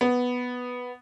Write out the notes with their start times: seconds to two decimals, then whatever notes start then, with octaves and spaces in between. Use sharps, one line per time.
0.01 B3